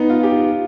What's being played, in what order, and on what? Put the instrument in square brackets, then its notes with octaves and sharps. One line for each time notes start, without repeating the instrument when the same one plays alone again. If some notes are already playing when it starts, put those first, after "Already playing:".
Already playing: [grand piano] B3 D#4
F4
G4
F4